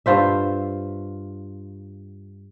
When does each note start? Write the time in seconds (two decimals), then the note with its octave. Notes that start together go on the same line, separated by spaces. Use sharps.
0.06 G2 F4 C5 E5